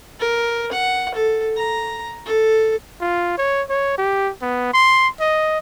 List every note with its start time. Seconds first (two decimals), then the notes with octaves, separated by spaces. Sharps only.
0.20 A#4
0.72 F#5
1.15 A4
1.57 A#5
2.26 A4
3.01 F4
3.38 C#5
3.69 C#5
3.98 G4
4.41 B3
4.73 C6
5.20 D#5